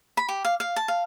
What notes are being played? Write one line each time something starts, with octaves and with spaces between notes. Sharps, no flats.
B5
G4
F5
F5
A5
F5